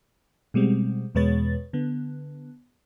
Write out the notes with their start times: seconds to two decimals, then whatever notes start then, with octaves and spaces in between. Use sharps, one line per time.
0.54 B2 G3 G#3 C4
1.15 E2 B2 G#3 B4 C#5 A6
1.73 D3 B3